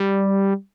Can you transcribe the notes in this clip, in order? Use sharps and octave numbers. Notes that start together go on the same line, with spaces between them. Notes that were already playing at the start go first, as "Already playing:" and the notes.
Already playing: G3